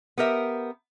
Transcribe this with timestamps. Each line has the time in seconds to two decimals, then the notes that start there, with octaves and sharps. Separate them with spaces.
0.18 B3 G4 A#4 E5